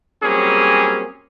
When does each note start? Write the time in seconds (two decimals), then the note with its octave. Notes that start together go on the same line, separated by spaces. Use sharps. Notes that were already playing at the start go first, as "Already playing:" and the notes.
0.23 F#3 G3 A#3 C4 C#4 G#4